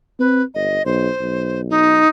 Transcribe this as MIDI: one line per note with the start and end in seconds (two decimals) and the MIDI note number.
0.19 0.42 60
0.19 0.42 71
0.54 0.78 31
0.54 0.83 75
0.86 1.08 35
0.86 1.61 72
1.20 2.02 35
1.70 2.09 63